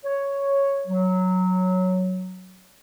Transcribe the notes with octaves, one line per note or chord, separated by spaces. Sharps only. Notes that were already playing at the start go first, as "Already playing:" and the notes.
C#5
F#3